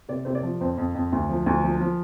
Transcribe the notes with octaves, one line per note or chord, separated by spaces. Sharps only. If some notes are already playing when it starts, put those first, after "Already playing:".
C3 D5
C3 C5
D5
F3
F2 C5
F2
F2
D2
F3
D2
F3
F3